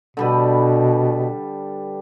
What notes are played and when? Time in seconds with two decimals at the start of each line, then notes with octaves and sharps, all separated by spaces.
0.17 B2 D3 G3 B4